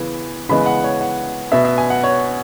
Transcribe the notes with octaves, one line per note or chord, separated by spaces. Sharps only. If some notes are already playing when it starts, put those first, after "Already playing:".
Already playing: C#3 E3 B3
C#3 E3 G#3 B3 B5
F#5
C#5
F#5
B2 B3 E5
E5
G#5
F#5
C#5